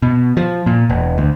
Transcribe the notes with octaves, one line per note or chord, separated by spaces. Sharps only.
B2
F3
A#2
E1
D2